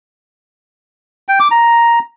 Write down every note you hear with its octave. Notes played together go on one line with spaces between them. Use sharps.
G5
D6
A#5